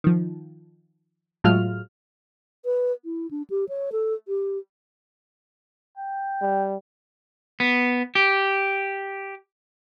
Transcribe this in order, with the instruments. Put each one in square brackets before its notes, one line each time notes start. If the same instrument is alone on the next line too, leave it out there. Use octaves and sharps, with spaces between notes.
[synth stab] D#3 F3
A2 F#3 G#3 F4 F6
[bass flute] B4
E4
D4
G4
C#5
A4
G4
[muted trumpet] G5
[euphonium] G3
[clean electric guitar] B3
G4